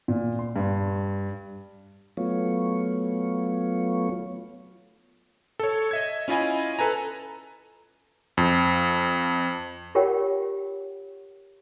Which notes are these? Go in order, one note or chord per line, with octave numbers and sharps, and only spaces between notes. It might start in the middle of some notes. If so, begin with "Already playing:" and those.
A#2
C6
G2
F#3 A3 B3 F4 C#5
A4 C#5
D#5 E5 G#6
C#4 E4 F4 D#5 G#5 B5
A4 B4 G#5 A#5
F2
F4 G4 A#4 C#5 F#5 G5